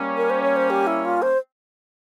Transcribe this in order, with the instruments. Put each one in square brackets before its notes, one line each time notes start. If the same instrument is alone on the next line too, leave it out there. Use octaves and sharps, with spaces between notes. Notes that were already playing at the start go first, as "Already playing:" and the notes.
Already playing: [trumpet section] G3 A#3 C#4
[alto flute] A#4
C5
C#5
C5
G4
E4
F4
C5